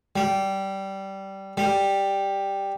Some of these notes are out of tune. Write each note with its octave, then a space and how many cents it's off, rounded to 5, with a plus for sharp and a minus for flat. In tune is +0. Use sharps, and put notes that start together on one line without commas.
G3 -15
G3 +5